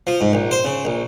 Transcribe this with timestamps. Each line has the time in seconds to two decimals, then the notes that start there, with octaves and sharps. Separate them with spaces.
0.07 F3
0.21 G#2
0.33 A#1
0.51 C5
0.64 C#3
0.85 A#1